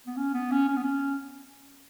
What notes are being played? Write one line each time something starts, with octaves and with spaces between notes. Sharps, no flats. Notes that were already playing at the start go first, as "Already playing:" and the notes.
B3
C#4
B3
C#4
C#4
B3
C#4